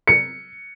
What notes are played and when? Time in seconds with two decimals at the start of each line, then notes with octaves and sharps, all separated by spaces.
0.07 C#7